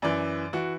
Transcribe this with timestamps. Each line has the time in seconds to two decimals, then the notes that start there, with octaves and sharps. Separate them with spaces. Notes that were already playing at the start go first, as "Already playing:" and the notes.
0.02 F#2 E3 D5
0.53 E3 F#4